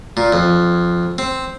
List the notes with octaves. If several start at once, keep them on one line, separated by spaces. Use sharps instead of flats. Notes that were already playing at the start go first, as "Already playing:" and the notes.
A#2
F2
C4